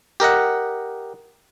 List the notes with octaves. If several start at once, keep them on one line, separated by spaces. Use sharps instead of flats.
G4 A#4 D#5 F#5